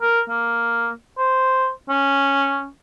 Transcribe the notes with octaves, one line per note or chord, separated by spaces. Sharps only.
A#4
A#3
C5
C#4